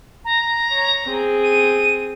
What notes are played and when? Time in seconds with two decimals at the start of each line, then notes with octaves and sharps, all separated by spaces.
0.25 A#5
0.71 C#5
1.05 C4 G#4
1.43 D#7